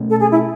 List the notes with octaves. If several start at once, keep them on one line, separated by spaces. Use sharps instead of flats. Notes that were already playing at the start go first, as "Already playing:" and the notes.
Already playing: B2 A3 C#4
A4
G#4
E4